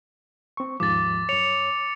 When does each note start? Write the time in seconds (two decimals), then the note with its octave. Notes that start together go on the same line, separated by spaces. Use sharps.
0.57 C4 C#6
0.80 D#2 G#2 F3 D6 A6
1.29 F#2 C#5 C#7 F7